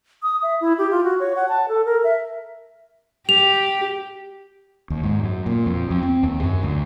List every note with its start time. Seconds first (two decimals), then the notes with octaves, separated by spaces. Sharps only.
0.23 D#6
0.43 E5
0.61 E4
0.78 G4
0.91 F4
1.04 F#4
1.20 C#5
1.36 F#5
1.49 A5
1.69 A4
1.85 A#4
2.04 E5
3.29 G4 F7
4.90 D#2
5.03 G#2
5.24 F#2
5.46 A#2
5.66 F2
5.90 F2
6.03 C4
6.23 D#2
6.43 F#2
6.63 D2